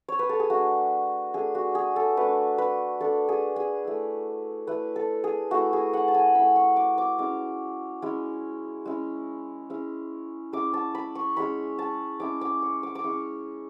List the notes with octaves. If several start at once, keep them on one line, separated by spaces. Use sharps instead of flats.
C#5
B4
A4
G#4
A3 D4 F#4
A3 D4 G#4
F#4
G#4
A4
A3 D4 B4
B4
A3 D4 A4
G#4
G#4
A3 E4
A3 E4 B4
A4
G#4
A3 E4 F#4
G#4
F#5
A5
G#5
A3 E4 B5
C#6
D6
D6
G#3 C#4 E4 D6
G#3 C#4 E4
G#3 C#4 E4
G#3 C#4 E4
G#3 C#4 E4 D6
A5
B5
C#6
G#3 C#4 E4 B5
A5
G#3 C#4 E4 D6
D6
C#6
D6
D6
G#3 C#4 E4 C#6